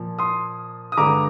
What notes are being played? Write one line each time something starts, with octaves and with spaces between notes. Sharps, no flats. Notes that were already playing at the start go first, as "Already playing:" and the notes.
Already playing: A#2 F3
C6 D#6
D#6
G2 D3 G#3 A#5 D6